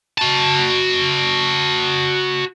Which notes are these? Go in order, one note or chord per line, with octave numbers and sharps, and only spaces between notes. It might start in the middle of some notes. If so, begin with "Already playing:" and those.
F#4 A5